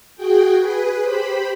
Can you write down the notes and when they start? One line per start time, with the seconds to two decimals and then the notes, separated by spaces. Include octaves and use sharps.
0.16 F#4 G#4 G5
0.58 G#4 B4
1.02 G4 C5 B5